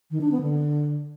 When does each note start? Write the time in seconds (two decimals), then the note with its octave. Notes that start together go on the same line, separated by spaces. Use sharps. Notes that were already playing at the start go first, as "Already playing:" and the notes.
0.11 D#3
0.21 D4
0.31 B3
0.42 D3